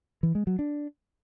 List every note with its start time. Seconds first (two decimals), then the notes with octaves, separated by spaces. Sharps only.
0.23 E3
0.35 G#3
0.47 F#3
0.59 D4